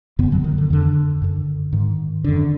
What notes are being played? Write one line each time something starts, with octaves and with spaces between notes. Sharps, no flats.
F#2 B2 B3
D3
F#2 F#3
D#3
D3
F2 D3
F#2 D3
G#2 D#3
F#2 D3